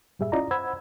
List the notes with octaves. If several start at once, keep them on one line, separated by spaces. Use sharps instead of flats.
G2 A#2 G3 G#4 E5
C#4 E4 F4 D5 D#5 A#5
C5 F#5 B5 E6 G#6